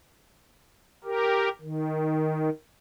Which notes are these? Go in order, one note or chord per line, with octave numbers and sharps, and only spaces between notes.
G4 A#4
D#3